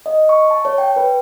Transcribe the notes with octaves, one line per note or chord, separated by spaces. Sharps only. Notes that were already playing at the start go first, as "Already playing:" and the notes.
D#5
C#6
A5
C#5
G5
B4